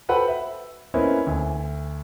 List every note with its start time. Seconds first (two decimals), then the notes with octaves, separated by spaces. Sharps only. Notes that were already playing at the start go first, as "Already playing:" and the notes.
0.09 F#4 A4 B4 C5 F#5 G5
0.28 E5
0.94 A#3 C#4 E4 B4 C5 D#5
1.27 D2 G#5